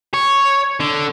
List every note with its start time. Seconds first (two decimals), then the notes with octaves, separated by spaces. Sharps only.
0.14 C#5
0.80 D3